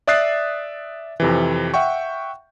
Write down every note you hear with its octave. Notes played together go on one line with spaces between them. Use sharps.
D5 E5 D#6 F#6 A6 C7
F2 C3 E3
E5 F#5 G5 C#6